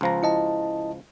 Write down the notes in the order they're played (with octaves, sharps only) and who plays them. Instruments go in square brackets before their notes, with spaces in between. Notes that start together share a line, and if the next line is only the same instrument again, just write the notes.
[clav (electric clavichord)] C#2 F3 A#5
[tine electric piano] E4 D#5 A5